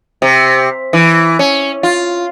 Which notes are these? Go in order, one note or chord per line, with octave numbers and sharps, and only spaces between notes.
C3
E3
C#4
F4